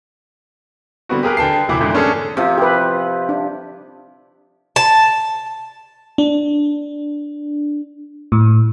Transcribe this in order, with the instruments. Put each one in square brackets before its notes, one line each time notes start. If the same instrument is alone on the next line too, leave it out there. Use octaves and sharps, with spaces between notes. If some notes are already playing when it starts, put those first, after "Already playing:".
[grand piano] D3 G3 B3 C4 F#4
G4 G#4 A#4 B4
D3 G5 A5 C7
F1 D2 E3 E4 D6
F2 G#2 D3 E3
A3 A#3 C#4 D4 G#4 A4
[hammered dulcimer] C3 F3
[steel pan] G4 B4
D4
[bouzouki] A5
[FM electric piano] D4
A2